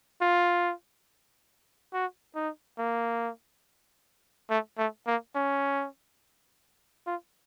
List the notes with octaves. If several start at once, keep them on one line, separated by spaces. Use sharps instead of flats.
F4
F#4
D#4
A#3
A3
A3
A#3
C#4
F4